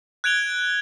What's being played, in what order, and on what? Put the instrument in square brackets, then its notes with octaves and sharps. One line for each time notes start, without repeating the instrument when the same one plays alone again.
[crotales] F#6 G#6 D7 F7 G7